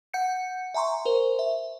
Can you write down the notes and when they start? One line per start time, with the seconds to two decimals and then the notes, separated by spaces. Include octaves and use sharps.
0.14 F#5 G6 C#7
0.74 E5 G#5 A#5 C6 C#6
1.05 A#4 C5
1.39 E5